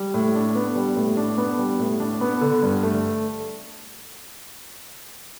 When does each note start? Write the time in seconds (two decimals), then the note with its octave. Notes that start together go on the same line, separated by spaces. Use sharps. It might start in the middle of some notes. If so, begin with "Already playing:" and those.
Already playing: G3
0.14 A2
0.35 D4
0.55 B3
0.75 G3
0.96 A2
1.17 D4
1.38 B3
1.59 G3
1.80 A2
2.00 D4
2.21 B3
2.41 D3
2.63 G2
2.83 A3